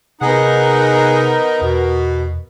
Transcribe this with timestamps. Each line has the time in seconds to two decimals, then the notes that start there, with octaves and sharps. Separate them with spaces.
0.21 C3 B3 D#4 G#4 A#4 F#5
1.62 E2 B2